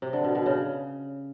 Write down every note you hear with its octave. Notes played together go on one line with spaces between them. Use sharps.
C3
D3
B2
B2
C#3